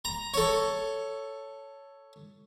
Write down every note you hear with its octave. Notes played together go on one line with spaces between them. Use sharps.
A#5
A4 C#5